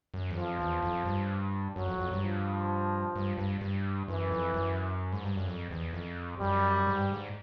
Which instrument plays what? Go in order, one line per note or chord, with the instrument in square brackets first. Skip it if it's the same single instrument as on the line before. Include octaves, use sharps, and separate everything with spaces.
[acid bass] F#2
E2
[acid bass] F2 [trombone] F3
[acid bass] E2
F2
G2
[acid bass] F#2 [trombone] F#3
[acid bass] F2
F2
G2
[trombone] F3
[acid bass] G2
G2
G2
[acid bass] F#2 [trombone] E3
[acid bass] F2
F#2
G#2
G2
F#2
F2
E2
F2
[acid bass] F#2 [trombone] G3
[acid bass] G#2
G2
G#2